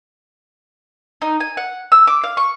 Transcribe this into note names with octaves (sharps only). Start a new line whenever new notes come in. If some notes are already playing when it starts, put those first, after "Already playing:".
D#4
G#5
F#5
E6
D6
F5
C#6